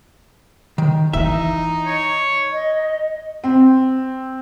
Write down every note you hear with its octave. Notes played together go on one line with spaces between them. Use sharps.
D#3
E3 D#4 E4 E5
C#5
D#5
C4